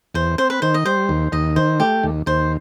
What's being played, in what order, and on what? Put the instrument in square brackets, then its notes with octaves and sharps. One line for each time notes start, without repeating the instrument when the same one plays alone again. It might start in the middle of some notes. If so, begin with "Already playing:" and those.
[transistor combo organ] E2 [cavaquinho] C5
[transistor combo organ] C4 [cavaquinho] C5
[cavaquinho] B4
[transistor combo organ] D#3 [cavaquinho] C5
[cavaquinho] D#5
[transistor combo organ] G3 [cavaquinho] C5
[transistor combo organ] D#2
[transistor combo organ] D#2 [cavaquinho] D#5
[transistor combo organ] D#3 [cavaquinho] C5
[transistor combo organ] A3 [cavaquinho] G4
[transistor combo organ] D#2
[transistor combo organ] D#2 [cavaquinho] C5